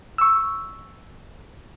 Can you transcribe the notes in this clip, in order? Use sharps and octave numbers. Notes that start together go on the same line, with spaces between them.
C#6 E6